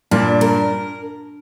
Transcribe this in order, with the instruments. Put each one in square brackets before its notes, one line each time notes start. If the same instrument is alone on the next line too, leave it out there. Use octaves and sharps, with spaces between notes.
[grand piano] G2 A#2 [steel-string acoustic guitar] D4
[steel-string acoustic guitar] A#4